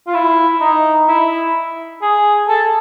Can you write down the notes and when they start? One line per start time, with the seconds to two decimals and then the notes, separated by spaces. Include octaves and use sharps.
0.07 F4
0.14 E4
0.61 D#4
1.08 E4
2.01 G#4
2.48 A4